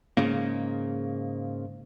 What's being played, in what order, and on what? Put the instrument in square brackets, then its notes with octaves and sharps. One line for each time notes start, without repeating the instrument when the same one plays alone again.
[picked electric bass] G#2 C#3 A#3